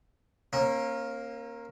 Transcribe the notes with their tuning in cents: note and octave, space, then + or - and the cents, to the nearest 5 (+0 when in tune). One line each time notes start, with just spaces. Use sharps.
A#3 +0 C#4 -40